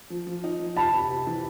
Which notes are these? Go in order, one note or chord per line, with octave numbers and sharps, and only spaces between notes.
F3
F3
D#4
F3
C3 A5 B5
C3
C3
E3